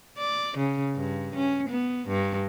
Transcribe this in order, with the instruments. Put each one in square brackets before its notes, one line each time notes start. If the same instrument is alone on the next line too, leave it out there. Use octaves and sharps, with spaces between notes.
[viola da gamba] D5
C#3
G2
C#4
B3
G2